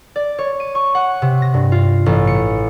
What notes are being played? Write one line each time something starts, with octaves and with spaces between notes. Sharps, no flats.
D5
C#5
D#7
C#6
F#5
C3
A#6
G2
F4
A1
C#7